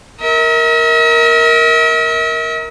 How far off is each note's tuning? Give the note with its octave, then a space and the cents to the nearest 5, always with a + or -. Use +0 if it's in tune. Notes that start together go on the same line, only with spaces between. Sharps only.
A#4 +0 E5 -45